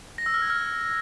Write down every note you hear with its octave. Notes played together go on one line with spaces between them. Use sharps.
A#6
E6
F6
G#6
F6